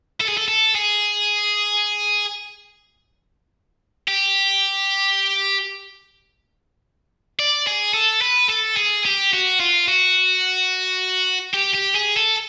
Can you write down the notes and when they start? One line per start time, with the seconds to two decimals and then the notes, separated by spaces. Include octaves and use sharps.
0.20 A4
0.28 G#4
0.37 A4
0.48 A4
0.75 G#4
4.08 G4
7.39 D5
7.67 G#4
7.94 A4
8.22 B4
8.50 A4
8.77 G#4
9.05 G4
9.33 F#4
9.60 F4
9.88 F#4
11.54 G4
11.75 G4
11.95 G#4
12.17 A4